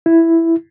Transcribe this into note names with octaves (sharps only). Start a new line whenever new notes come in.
E4